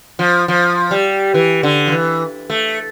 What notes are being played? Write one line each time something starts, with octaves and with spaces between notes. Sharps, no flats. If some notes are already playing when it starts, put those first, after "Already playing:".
F3
F3
G3
E3
D3
F3
E3
A3